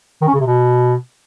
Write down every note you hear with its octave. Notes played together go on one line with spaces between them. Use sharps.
D#3
C#4
C#3
C3
B2